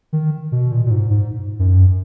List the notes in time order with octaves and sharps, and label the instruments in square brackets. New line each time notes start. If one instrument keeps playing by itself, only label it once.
[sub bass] D#3
B2
A#2
A#2
G#2
G#2
F#2